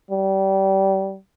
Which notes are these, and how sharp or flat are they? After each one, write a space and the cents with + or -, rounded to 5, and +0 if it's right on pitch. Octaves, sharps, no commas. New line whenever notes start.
G3 -25